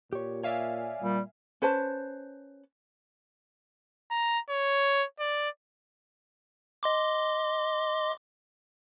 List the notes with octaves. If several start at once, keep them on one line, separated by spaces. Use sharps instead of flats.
A#2 G4 C#5
C#5 D5 E5 F5 G#5
A#2 G3
C#4 B4 C5 A5
A#5
C#5
D5
D#5 C6 D6